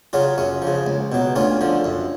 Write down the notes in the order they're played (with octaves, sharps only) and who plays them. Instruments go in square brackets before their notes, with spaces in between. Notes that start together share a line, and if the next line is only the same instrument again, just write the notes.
[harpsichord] C#3 F#3 C#4 F4
F#2 C#4
C#3 F3
C#2
B2 F#3
D2 C#4 F4
D3 F3
F#2